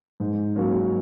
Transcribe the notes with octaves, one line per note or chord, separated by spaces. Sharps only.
G#2
F#3 A#3 C#4